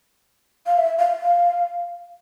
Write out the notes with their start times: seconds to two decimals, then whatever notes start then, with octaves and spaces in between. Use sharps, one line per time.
0.67 F5
0.78 E5
0.99 F5
1.21 F5